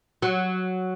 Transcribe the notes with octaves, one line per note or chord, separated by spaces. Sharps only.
F#3